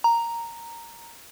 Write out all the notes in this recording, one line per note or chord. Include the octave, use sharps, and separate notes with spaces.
A#5